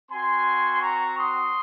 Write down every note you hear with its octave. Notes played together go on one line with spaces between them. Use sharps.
C4 F#4 G#5 C6
A#5 C#6
C6 D#6